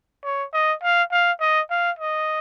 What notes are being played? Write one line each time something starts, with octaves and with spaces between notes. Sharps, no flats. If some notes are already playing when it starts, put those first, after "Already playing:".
C#5
D#5
F5
F5
D#5
F5
D#5